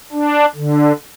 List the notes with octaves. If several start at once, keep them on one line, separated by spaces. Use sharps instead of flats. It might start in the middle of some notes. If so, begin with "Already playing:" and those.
D4
D3